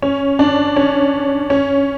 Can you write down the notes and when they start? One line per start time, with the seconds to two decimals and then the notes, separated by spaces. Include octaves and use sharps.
0.02 C#4
0.39 D4
0.76 C#4
1.50 C#4